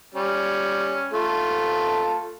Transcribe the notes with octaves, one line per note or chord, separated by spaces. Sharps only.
G3 C#4
A3 F4 A4